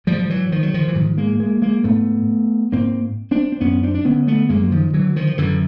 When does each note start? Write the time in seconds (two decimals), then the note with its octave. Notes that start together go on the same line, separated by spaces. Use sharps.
0.07 G#2 F3 G3
0.19 F3
0.30 E3 F#3
0.52 D#3 F3
0.63 F#3
0.74 D#3 F3
0.88 E3
0.95 G#2 D#3 F3
1.17 G#3 A#3
1.40 G#3 A#3
1.62 G#3 A#3
1.84 G#2 A3 B3
2.72 G#2 A#3 C4
3.31 C4 D4
3.52 C4
3.61 F#2 B3 C#4
3.83 C4 D4
3.94 D4
4.05 D3 B3 C#4
4.27 A3 B3
4.49 F#2 G#3 A#3
4.63 F#3
4.71 D#3 F3
4.94 D3 E3 F#3
5.16 D#3 F3
5.27 F3
5.38 F#2 D3 E3